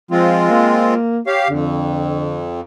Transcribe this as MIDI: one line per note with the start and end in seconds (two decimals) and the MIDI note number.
0.11 0.47 53
0.11 0.94 56
0.11 0.94 60
0.11 0.94 65
0.50 1.19 58
1.27 1.48 67
1.27 1.43 73
1.27 1.48 77
1.50 2.61 41
1.50 2.49 50